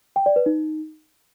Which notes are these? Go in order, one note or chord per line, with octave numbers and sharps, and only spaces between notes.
G5
D5
B4
D#4